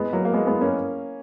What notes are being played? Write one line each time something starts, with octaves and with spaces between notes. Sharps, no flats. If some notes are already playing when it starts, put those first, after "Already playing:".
Already playing: G#3 B3
F#3 A#3
A#3
G#3 B3
G#3 B3
A#3 C#4